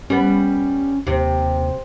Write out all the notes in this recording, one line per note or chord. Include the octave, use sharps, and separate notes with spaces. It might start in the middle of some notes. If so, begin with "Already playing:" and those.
G3 B3 C#4
D#2 C3